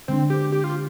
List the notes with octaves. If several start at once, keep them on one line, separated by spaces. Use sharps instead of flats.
D3 G#3 C4 D4
G4
G4
F4